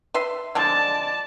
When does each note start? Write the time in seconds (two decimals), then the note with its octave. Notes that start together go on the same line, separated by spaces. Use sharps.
0.14 B4 E5 C6
0.55 D3 F3 G#3 D5 A5